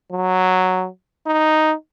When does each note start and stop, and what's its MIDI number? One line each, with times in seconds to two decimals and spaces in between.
0.12 0.87 54
1.27 1.74 63